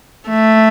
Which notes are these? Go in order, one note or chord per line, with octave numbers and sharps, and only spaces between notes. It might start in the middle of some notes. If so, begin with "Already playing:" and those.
A3